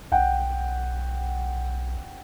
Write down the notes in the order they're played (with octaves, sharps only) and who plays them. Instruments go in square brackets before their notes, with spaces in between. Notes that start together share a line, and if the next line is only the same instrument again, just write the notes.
[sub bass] B1 [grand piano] F#5 G5